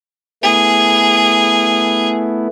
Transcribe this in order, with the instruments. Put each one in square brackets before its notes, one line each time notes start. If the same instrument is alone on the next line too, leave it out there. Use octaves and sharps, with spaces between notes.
[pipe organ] A3 B3 E4 [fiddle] G#4